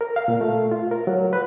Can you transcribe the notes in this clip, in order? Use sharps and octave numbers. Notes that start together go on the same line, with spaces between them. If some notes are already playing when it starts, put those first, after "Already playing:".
A#4
F5
A#2
A3
F4
A#4
F#3
B4